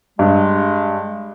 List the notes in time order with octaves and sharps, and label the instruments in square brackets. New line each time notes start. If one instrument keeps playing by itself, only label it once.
[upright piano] G2 [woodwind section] G#3